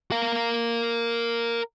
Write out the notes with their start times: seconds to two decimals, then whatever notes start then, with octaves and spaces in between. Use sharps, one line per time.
0.12 A#4 F5